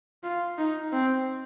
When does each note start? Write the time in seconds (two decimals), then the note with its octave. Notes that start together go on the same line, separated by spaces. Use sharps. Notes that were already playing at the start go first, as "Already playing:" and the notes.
0.23 F4
0.58 D#4
0.92 C4